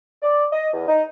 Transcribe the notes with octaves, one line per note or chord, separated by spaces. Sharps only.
D5
D#5
E2
D#4